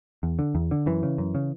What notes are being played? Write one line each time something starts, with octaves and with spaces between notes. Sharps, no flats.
E2
D3
E2
D3
F#2 E3
C#3
F#2
C#3